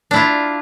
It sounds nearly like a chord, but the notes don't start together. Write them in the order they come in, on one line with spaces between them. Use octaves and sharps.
D4 E4 F4